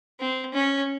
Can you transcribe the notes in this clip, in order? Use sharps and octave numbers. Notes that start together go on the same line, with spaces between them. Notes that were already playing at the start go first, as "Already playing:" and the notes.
C4
C#4